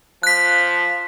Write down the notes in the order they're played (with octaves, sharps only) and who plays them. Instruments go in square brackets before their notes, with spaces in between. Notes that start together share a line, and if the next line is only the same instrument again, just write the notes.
[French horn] F3 [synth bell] F#6 B6